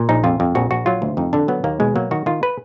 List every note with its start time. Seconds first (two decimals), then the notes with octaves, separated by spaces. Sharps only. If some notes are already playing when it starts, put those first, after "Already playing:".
Already playing: A#2
0.09 A#1 D#4
0.24 F2 F4
0.40 F2
0.55 A#1 F#4
0.71 A#1 F#4
0.86 F#3 F4
1.02 D2
1.17 F2 D#4
1.33 D3 D4
1.48 F#3 B3
1.64 D#2 A#3
1.80 B2 G#3
1.96 F#3 A#3
2.11 D#3 F#4
2.26 D#3 F4
2.43 B4